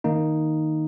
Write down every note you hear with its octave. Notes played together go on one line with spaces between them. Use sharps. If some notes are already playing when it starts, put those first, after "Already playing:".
D#3 A#3 D#4